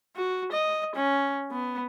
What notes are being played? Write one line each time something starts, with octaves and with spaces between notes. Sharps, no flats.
F#4
D#5
C#4
B3